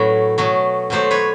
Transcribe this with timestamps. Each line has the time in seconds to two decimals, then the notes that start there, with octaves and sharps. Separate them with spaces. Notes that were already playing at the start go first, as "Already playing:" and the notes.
Already playing: A2 F#3 A3 B4 C#5
0.38 B2 F#3 A3
0.90 B2 F#3 A3 C5 D5
1.11 B4 C#5